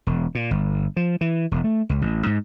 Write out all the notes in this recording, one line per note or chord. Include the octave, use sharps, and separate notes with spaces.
E1
A#2
G1
F3
E3
E1
A3
C#2
A1
G#2